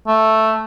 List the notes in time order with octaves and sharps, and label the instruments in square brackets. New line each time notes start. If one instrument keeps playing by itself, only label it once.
[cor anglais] A3